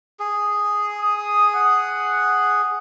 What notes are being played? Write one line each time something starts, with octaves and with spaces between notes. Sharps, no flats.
G#4
D#6
F#5